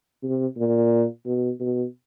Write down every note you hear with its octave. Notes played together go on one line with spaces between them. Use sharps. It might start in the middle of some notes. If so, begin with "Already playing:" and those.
C3
A#2
B2
B2